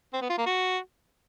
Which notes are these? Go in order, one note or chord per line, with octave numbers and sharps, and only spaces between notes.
C4
B3
F4
A#3
F#4